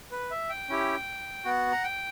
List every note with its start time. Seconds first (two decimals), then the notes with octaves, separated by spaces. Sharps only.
0.11 B4
0.31 E5
0.49 G5
0.69 C#4 E4 G4
1.45 B3 F#4 F#5
1.72 A#5
1.84 G5